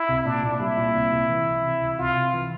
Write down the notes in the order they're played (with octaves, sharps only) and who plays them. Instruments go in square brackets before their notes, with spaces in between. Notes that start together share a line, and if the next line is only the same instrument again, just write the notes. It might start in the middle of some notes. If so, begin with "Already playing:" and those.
Already playing: [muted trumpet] E4
[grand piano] C2
[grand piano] A#2 [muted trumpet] D4
[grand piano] A#2
[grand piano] G3 [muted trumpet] E4
[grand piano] A#2
C2
C2
E3
E3
C3
C2
[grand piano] C2 [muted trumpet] F4
[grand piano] C3
E3